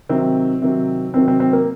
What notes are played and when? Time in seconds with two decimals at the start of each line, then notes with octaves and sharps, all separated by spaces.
0.09 C3 D#3 F#3 C4
0.62 C3 D#3 F#3
1.14 C3 D#3 F#3 C4
1.28 C4
1.40 C4
1.53 A#3